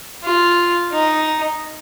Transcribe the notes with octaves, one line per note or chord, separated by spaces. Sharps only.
F4
D#4